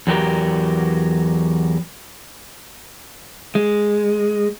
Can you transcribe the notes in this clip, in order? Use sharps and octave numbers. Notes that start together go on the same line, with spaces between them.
E2 F#3 G4 A#4
G#3